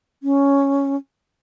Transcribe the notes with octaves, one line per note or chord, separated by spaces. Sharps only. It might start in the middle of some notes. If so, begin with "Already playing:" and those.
C#4